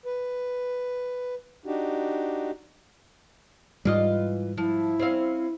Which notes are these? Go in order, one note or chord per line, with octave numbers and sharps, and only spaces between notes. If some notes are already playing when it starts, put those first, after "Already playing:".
B4
D4 D#4 F#4 G4
G#2 E3 G3 F4 D#5
F3 E4
C4 C#4 F5